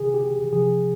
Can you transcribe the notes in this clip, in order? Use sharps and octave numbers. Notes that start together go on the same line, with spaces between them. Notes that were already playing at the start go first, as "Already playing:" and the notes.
Already playing: C3 D#3 G#4
G4
C3 F3 G#4